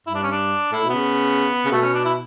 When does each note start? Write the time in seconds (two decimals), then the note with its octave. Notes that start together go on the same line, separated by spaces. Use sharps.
0.07 G2 E4
0.15 D4
0.23 C#4
0.31 D4
0.72 A2 E4
0.84 B2
0.90 C#3 B3
1.65 C#3
1.71 B2 A3
1.82 C#4
1.94 D4
2.05 E4